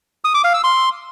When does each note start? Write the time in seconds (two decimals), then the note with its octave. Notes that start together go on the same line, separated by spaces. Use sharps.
0.24 D#6
0.34 D6
0.44 F5
0.54 E6
0.64 C6